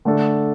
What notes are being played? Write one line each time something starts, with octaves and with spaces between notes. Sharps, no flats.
D3 A3 D4 A4